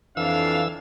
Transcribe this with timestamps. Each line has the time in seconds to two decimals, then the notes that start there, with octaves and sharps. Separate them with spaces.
0.17 F2 E3 D4 F5 E6